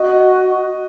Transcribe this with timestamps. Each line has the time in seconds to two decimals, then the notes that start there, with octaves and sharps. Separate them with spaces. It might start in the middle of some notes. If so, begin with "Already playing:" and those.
Already playing: F#4 D#5